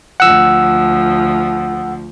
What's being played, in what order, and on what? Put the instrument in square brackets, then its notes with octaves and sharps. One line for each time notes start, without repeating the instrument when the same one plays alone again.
[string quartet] D2 F3 [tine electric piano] F#5 E6